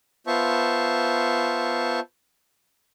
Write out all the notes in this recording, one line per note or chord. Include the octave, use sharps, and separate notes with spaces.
B3 F4 C5 E5 A5 C#6